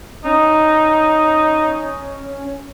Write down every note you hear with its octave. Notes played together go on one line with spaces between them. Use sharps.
C#4 D#4